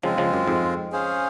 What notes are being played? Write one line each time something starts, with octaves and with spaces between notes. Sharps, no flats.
C#3 F3 G#3 C4 F4
C#3 F3
F#2
F2 G#2
C#4 G#4 C5 F5